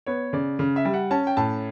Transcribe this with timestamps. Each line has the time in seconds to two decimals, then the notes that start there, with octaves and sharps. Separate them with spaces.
0.06 B3 C#5
0.33 C#3 D5
0.59 C#3
0.76 E5
0.85 G3
0.94 F#5
1.10 C#4 A5
1.27 G5
1.37 A2 A5